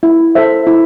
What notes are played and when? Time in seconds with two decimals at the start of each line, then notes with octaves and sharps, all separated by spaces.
0.03 E4
0.35 A4 C5 E5
0.67 E4